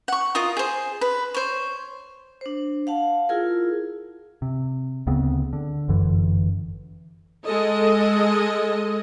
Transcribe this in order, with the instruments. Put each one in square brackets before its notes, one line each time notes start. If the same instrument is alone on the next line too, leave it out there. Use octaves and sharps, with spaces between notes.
[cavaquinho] F#5 C#6
F4 A#4 D#5 D#6
G#4 C5
B4
C5 C#5
[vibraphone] D4 C5
F5 F#5 A5
E4 F4 G#4 A#4
[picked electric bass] C3
D2 C#3 B3 C4
D3
G1 F#2 D3 E3
[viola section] G#3 A4 D#5